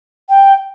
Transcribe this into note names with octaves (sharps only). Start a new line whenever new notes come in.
G5